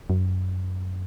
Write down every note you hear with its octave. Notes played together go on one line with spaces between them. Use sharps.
F#2